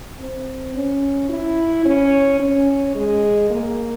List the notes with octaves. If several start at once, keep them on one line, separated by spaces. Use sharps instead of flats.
C4
C#4
E4
C#4
C#4
G#3
A#3